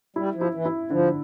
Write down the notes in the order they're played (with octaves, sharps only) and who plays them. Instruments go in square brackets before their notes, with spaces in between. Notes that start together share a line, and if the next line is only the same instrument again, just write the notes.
[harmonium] G3 [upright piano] E4
[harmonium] F3
[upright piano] E4
[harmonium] E3
[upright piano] E4
[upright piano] D3 [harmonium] F3